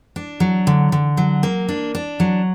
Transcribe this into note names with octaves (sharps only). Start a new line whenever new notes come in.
D4
F#3
D3
D3
F#3
A#3
D4
D4
F#3